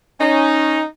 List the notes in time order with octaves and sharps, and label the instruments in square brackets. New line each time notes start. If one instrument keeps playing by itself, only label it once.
[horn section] C#4 D#4